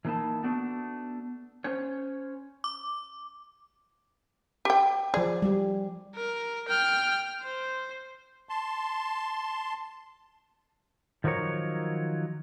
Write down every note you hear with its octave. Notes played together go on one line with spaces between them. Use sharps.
E3 A#3 D#4 E4 A5
A3 B3 D4 F#4
C#4 C5 C#5
D6
G4 G5
F3 G#4 D5
G3 G4
A#4
G5 F6
C5
A5 C6
D#3 F3 F#3 A#4 C#5